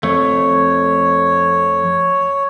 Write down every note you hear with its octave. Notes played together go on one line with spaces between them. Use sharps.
F2 A3 C#5